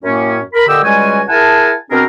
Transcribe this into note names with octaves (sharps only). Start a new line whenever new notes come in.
F#2 A2 A#3 C#4
A#4 B5
A#2 D3 G4 D#5 G5 E6
C#2 G3 G#3 F#4 G#5
E4 G#4 A#4 F#5 G#5 A5
B2 C4 D4 G#4 A#4